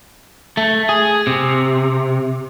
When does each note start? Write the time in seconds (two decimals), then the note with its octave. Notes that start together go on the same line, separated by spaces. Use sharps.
0.57 A3
0.89 G#4
1.27 C3